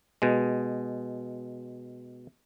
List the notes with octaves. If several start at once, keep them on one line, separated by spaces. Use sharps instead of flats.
B2 G#3